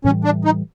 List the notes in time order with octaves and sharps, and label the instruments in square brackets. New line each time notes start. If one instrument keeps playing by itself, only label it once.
[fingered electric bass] A2 E3 G3 [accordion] C#4
[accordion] D4
D#4